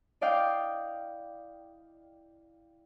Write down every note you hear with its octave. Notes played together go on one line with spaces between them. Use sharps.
E4 D5 D#5 F5 G5